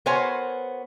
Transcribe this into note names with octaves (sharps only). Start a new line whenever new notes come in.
B3 F#4 A#4 C5 C#5 G#5